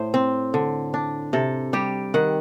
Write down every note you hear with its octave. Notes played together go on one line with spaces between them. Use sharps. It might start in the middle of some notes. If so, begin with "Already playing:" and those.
Already playing: A2 C5
C4
D3
D4
C3 A4
G3 G4
D#3 F#5